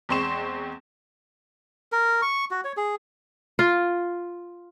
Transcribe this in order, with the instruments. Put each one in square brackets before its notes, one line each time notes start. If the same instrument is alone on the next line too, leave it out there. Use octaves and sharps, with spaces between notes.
[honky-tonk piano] E2 G#3 C4 C6 C#6 E7
[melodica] A#4
C#6
F#4
C#5
G#4
[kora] F4